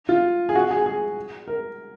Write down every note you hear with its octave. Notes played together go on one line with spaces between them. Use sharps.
F4
G#4
F#4
G#4
G#4
A#4